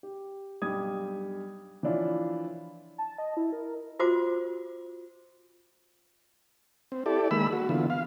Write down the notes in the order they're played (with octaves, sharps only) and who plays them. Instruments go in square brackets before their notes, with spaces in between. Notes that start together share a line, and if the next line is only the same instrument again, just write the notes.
[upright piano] G4
B1 G2 G4 D#6 G#6
E3 F3 D4 E4 F4 C#5
[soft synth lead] A5
D#5
E4
A#4
[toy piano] F4 F#4 C5 D6
[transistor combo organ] C4
E4 G4 A4 D5
D#3 G#3 A#3 B5 E6
F#4
D3 E3 B3 F4
F5